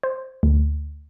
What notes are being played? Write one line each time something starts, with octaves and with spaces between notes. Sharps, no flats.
C5
D2